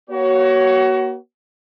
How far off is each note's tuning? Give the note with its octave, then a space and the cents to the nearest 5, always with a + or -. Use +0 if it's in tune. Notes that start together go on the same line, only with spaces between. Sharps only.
A#3 +40 F#4 +30 C#5 +0